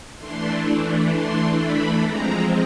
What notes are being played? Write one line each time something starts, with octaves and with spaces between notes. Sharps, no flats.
E3 A3 D4 C6
C6
B5
F3 G#3 C4 A#5